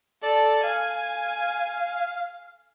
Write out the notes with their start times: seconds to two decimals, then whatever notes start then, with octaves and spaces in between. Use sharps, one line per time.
0.23 A4 D5
0.64 F5 G#5